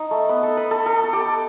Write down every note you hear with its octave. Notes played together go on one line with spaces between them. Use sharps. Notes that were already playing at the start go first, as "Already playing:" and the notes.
Already playing: D#4
A3
B3
A4
B4
A4
A4
A4
G4